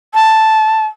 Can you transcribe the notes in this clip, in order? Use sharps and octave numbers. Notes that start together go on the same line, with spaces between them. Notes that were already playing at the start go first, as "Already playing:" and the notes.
A5